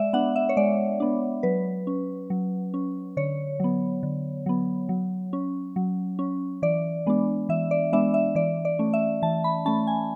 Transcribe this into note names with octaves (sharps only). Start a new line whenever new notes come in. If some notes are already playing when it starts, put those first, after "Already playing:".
Already playing: G#3 D5 E5
B3 D4 F#5
E5
C#5
G#3 D5
B3 D4
F#3 B4
C#4
F#3
C#4
D3 C#5
F#3 B3
D3
F#3 B3
F#3
C#4
F#3
C#4
E3 D5
G#3 B3 D4
E3 E5
D5
G#3 B3 D4 E5
E5
E3 D5
D5
A3 C#4
E5
E3 A5
B5
A3 C#4 A5
G#5